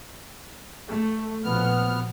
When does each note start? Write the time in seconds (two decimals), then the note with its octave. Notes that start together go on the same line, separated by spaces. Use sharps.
0.88 A3
1.44 A#1 B2 F3 B3 F6